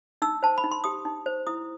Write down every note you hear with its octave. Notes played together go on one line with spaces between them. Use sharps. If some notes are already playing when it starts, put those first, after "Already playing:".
D#4 E6
C5 A5
B5
D#4
C6
G4 D#6
D#4
C5
E4 D#6